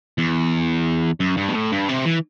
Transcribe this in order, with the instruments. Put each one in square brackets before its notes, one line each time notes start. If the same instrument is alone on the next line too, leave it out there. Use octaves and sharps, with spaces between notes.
[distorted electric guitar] E2
F#2
G2
B2
A2
G2
C3
E3